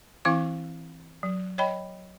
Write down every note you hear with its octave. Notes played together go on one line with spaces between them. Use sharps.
E3 C4 E4 F5 D6
F#3
C#5 D#5 G5 B5